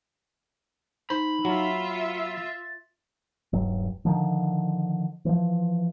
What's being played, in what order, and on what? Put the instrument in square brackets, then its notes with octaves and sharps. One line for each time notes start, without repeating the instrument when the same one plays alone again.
[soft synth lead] D#4 [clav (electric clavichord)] C5 [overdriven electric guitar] B5
[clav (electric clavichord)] F#3 [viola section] F4 E5
[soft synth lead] C#7
A6
[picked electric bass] D#1 G2 F#3
D3 D#3 F3
E3 F3